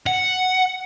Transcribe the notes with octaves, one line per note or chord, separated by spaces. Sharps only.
F#5